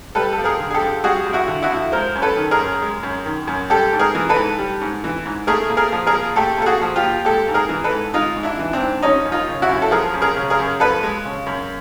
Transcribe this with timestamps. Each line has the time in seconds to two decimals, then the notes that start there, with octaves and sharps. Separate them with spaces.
0.15 G3 A4 B4
0.33 A4
0.38 F2
0.44 G#4 A#4
0.60 D3
0.71 G#4
0.74 G4 A4
0.81 F2
1.04 G3 F#4 G#4
1.27 F2
1.33 E4 F#4
1.48 D3
1.62 E4 F#4
1.71 F2
1.92 G#3 A#4 C5
2.15 F#2
2.22 A4 B4
2.36 D#3
2.51 G#4 A#4
2.59 F#2
2.82 G#3
3.03 F#2
3.26 D#3
3.47 F#2
3.70 G3 G4 A4
3.93 G#2
3.99 G#4 A#4
4.15 E3
4.29 A4 B4
4.36 G#2
4.59 G3
4.81 G#2
5.04 E3
5.26 G#2
5.47 A3 G#4 A#4
5.70 A#2
5.77 G#4 A#4
5.92 F3
6.07 G#4 A#4
6.14 A#2
6.36 A3 G4 A4
6.58 A#2 A4
6.66 F#4 G#4
6.82 F3
6.96 F4 G4
7.04 A#2
7.25 G#3 G4 A4
7.48 G#2
7.54 G#4 A#4
7.69 E3
7.84 A4 B4
7.91 G#2
8.14 G#3 D#4 F4
8.37 G#2
8.43 D4 E4
8.59 E3
8.73 C4 D4
8.81 G#2
9.03 F3 C#4 D#4
9.25 F#2
9.32 D#4 F4
9.48 C#3
9.62 E4 F#4
9.69 F#2
9.82 A4
9.91 F3 G#4 A#4
10.14 F#2
10.22 G#4 A#4
10.36 C#3
10.50 G#4 A#4
10.59 F#2
10.80 F3 A4 B4
11.03 G#3
11.25 C#3
11.46 F#2